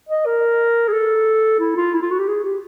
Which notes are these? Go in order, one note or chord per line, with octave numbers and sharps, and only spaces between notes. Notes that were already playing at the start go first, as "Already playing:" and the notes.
D#5
A#4
G#4
A4
E4
F4
E4
F4
F#4
G4
G#4
G4